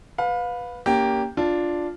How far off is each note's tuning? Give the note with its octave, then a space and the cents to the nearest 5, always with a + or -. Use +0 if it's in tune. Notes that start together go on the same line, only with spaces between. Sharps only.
B4 +0 F5 +30
A#3 +0 C#4 +30 G4 +0
D4 +0 F4 +0